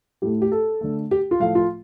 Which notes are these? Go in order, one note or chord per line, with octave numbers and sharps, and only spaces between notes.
A2 A3 G4
G4
A4
D3 A3
G4
F4
A2 F3 A3 F5
F4